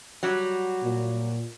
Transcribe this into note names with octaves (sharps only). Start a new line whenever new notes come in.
F#3 G3 F#4
A#2